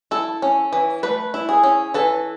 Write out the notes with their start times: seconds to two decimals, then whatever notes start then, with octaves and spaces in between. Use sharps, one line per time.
0.11 E4 A4
0.42 C#4
0.73 E3
1.03 A3 B4
1.34 E4
1.49 G#4
1.63 C#4
1.94 E3 A4